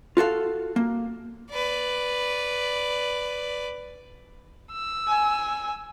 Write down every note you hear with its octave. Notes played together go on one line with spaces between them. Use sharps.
F4 F#4 A4 F5
A#3
B4 D5
E6
G#5